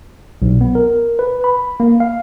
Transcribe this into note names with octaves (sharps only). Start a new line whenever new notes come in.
B1
B3
A#4
B4
B5
A#3
F5